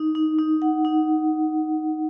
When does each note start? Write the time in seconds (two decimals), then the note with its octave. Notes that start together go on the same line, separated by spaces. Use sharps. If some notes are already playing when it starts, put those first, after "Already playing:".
Already playing: D#4
0.15 D#4
0.38 D#4
0.62 F#5
0.85 D#4